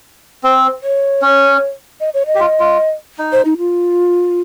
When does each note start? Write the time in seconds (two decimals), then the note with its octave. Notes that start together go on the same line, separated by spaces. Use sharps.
0.44 C4 C5
0.83 C#5
1.22 C#4
2.00 D#5
2.14 C#5
2.27 D#5
2.35 G4
2.40 F4
2.60 F4
3.19 D#4
3.32 C5
3.45 D#4
3.58 F4